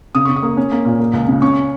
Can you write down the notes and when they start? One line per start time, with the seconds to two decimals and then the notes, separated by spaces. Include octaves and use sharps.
0.15 C#3 D#6
0.25 C#3 C#6
0.36 D#6
0.43 A#3
0.57 C#4
0.72 A#3
0.85 A#2
1.00 A#3
1.13 C#2
1.28 C#3
1.42 C#4 C#6